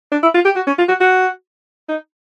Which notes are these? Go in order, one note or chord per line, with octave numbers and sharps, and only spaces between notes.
D4
E4
F4
G4
F#4
C#4
F4
F#4
F#4
D#4